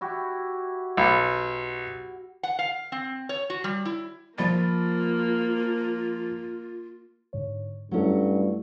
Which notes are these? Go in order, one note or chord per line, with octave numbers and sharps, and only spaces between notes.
E4 F#4 G4
B1
F#5
F5
C4
C#5
F#4
G3
E4
F3 A#3 F4 B5 A6
G#2 D3 C#5
G2 F#3 A3 C#4 E4 A4